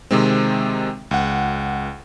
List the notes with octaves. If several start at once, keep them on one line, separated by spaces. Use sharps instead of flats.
C3 D#3 G#3 C4
C#2 F#5